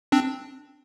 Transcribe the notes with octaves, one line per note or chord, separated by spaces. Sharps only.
C4 D4